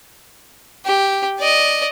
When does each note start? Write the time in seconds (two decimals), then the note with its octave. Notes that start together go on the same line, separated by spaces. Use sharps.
0.85 G4
1.39 D5 D#5